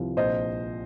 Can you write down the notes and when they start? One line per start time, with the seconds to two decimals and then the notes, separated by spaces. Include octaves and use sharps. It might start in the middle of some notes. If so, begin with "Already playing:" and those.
Already playing: C2 F3
0.17 A#1 C5 D#5